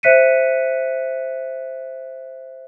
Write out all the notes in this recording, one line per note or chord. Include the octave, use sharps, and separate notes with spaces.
C5 E5 F#6 B6 C#7 D#7